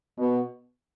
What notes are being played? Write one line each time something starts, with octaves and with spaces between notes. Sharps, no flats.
B2